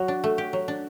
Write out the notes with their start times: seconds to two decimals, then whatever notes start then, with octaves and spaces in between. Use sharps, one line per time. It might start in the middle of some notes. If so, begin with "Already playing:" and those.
Already playing: F#3 F#4
0.08 D4
0.24 A3
0.38 G4
0.53 F#3
0.68 D4